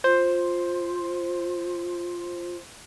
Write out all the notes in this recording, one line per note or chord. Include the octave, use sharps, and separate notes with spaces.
F4 C5